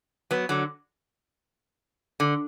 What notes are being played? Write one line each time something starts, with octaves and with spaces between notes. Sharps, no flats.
F#3 B3
D3 F#3
D3